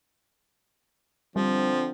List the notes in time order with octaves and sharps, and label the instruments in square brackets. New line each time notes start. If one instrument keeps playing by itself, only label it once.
[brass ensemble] D3 C4 [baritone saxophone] F3 [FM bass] G3